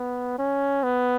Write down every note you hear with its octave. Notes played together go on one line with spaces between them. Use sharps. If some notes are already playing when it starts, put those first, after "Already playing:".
Already playing: B3
C#4
B3